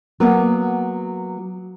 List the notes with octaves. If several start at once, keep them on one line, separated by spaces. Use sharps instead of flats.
F#3 A#3 B3